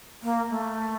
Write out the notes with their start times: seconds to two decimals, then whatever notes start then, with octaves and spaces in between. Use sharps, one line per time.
0.23 A#3
0.50 A3